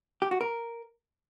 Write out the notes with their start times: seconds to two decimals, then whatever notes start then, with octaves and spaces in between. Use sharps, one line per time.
0.22 G4
0.31 F#4
0.41 A#4